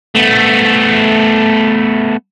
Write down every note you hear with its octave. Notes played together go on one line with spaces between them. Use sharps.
A3 B3